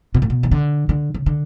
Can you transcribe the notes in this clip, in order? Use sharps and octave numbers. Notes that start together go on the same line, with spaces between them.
B2
A2
B2
E3
D3
D3
C#3
D3